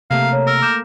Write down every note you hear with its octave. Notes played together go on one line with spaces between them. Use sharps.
C3 A3 A#3 G4 F5
C#5
A#4 E6
D6 G6 E7